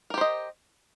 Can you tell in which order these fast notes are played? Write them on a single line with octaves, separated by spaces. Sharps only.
A#4 G4 C5 D#5